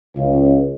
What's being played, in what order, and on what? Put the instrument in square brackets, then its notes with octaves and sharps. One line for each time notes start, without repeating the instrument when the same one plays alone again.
[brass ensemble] C#2